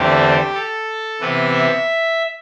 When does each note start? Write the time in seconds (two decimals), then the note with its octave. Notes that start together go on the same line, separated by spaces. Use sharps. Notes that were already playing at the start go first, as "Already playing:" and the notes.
Already playing: E2 D3 A3 C4 G4
0.54 A4
1.21 C3 E3 B3 B4
1.53 E5